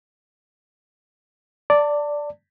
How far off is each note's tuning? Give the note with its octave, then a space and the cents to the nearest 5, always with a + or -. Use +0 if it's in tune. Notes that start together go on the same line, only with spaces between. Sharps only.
D5 -5 A5 +30